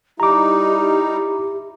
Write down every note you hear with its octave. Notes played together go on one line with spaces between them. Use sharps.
G3 D#4 E4 G4 A#5 D6